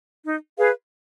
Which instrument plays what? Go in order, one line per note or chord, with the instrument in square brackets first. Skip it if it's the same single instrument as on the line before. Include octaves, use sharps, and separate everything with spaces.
[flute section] D#4
G#4 B4 F5